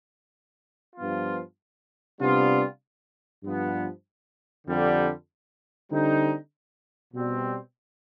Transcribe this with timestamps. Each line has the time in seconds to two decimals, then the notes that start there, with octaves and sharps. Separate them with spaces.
0.96 G2 F3 B3 F4
2.19 C3 G3 B3 D4 F4
3.43 G2 F3 B3
4.67 F2 D3 G3
5.90 D3 G3 C4 D#4
7.13 B2 G3 C4